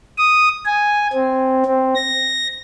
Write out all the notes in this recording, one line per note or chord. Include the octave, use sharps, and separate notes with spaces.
D#6
G#5
C4
C4
A#6